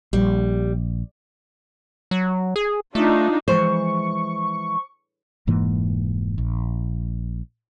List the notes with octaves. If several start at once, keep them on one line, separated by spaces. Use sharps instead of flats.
A#1 G3
F#3
G#4
A3 D4 D#4 F4
E3 F3 G#3 C5 C#6
F1 G#2 E3 A#3
A#1